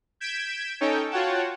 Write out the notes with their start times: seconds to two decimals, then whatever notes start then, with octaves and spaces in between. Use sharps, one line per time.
0.20 G6 G#6 B6 D7 E7
0.81 C#4 D#4 A4 C#5 G5
1.11 F4 F#4 C#5 F#5 G5 A5